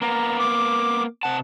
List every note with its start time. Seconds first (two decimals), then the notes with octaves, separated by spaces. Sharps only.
0.02 A#3 B3 A#5
0.39 D6
1.23 C3 F#5 A5